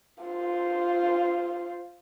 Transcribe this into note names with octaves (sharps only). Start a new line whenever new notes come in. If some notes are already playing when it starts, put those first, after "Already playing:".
F4 C5